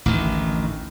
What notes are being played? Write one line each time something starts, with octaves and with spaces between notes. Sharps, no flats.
A1 D2 D#3